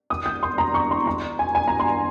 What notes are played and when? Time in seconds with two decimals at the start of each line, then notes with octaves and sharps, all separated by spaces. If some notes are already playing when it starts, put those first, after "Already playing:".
0.10 D#6
0.26 G6
0.43 C6
0.58 A#5
0.74 C#6
0.91 C6
1.07 A#5
1.39 G#5
1.55 G#5
1.68 A#5
1.80 C6